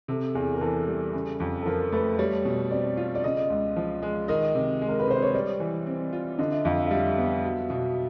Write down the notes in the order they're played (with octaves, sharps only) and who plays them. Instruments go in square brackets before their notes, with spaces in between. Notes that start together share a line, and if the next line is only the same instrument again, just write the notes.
[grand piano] C3 [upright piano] A4
[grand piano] E2 [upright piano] G#4
[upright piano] A#4
[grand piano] E3 [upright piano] A4
[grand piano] G3
C#3
F2
[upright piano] A4
[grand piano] F3 [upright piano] A#4
[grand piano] A3 [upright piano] B4
[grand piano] G3 [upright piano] C#5
[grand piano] B2
[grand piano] C4 [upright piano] D5
[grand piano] F4
[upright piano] D5
[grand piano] C#3 [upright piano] D#5
[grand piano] C#2
F3
G#3
[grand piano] D#3 [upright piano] D#5
[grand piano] C3
G#3
[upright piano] A#4
B4
[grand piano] C3 [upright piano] C5
[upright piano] C#5
[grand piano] G3 [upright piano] D5
[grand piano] E3
C4
F4
[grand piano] D3 [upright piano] D#5
[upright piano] E5
[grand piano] F2 [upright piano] F5
[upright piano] E5
F5
[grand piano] G3 [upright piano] E5
[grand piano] B3
F#3
B2